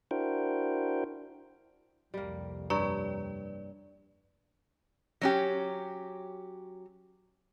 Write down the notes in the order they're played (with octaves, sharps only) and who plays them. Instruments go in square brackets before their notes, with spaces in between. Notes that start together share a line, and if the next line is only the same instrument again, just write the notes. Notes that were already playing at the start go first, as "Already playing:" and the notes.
[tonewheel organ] D4 E4 F#4 A#4 C5 G5
[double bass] C2 F2 [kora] G3 A#3
[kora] G2 G3 C#5 [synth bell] B4 D5 [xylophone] A#5 C#6
[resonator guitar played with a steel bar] F#3 C#4 G4